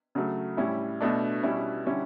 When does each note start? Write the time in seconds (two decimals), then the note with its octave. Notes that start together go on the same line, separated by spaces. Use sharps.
0.15 C#3 F#3 A3
0.57 A2 G3 C#4 E4
1.01 B2 A3 D4
1.43 B2 G3 C#4 E4
1.86 D3 G3 C#4 E4